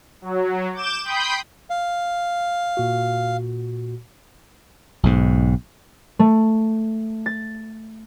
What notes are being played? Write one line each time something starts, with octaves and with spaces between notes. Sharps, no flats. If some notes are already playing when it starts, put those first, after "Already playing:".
F#3
D6 G6 E7
G5 B5 C6 D#6 G6
F5
A#2 F#4
B1 G#2
A3
A6